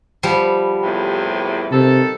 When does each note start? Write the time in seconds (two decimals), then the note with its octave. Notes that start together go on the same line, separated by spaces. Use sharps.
0.23 F3 G3 B3
0.83 E2 A2 C3
1.72 C3 D#3 A4